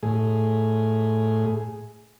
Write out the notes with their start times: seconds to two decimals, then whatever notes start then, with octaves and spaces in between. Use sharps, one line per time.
0.03 A2 G#4